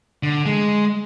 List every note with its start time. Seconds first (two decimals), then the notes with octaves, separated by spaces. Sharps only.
0.23 D3
0.46 G#3